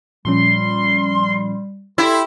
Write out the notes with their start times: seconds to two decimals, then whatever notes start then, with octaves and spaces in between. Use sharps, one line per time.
0.25 A#2 F3 G3 C#4 C6
1.98 E4 G4 A4 D5 C6